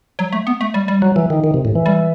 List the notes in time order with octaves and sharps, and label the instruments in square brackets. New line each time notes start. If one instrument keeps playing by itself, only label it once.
[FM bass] F#3
A3
B3
A3
G3
G3
[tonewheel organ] F#3
E3
D#3
D#3
C3
A2
E3
[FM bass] G3